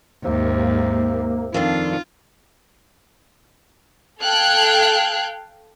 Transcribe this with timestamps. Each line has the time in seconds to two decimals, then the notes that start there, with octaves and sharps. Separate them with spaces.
0.24 D#2 G#2 C3 A#3
1.54 F2 D#3 D4 F4
4.21 A4 F5 G5 F#6 G#6